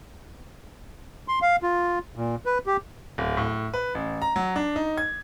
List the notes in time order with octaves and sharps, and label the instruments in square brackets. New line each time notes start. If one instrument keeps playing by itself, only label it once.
[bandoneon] C6
F5
F4
A#2
B4
G4
[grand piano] D1
A2
B4
A1
A#5
F#3
D4
D#4
G#6